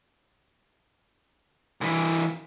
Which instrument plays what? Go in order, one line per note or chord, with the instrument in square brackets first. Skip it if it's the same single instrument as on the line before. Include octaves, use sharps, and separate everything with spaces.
[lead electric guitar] C2 E3